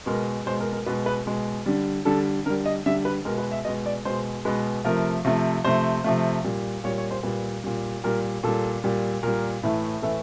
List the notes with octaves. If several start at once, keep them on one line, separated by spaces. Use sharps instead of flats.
B2 G#3 A#4
B2 G#3 C5
A#4
A#4
B2 G#3 B4
B4
B2 G#3
D3 G3
D3 G3 A4
D3 G3 A#4
D#5
D3 G3 E5
B4
B2 G#3 A#4
B4
E5
B2 G#3 D#5
D5
B2 G#3 C5
B2 G#3 B4
C3 F3 A3 A#4
C3 F3 A3
C3 F3 A3 C5
C3 F3 A3
A#2 G3
A#2 G3 C#5
C#5
C5
A#2 G3 B4
A#2 G3
A#2 G3 A#4
A#2 G3 A4
A#2 G3
A#2 G3 A#4
A2 E3 A3
A2 E3 A3 A4